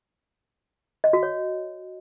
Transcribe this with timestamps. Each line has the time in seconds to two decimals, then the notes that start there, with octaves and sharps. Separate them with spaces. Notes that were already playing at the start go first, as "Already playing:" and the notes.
1.04 D#5
1.13 F#4
1.23 C#5